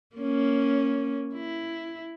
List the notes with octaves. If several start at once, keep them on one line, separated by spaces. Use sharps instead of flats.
A#3 C#4
E4